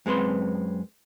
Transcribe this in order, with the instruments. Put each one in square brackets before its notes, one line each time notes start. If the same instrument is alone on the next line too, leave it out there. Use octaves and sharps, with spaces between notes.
[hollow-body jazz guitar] F#2 G#3 C4 B4 C6